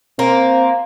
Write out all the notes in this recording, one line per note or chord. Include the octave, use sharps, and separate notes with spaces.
A#3 C4